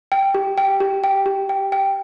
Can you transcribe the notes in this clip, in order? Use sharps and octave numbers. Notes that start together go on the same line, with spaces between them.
G5
G4
G5
G4
G5
G4
G5
G5